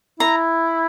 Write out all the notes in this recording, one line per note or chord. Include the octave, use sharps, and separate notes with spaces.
E4 A#5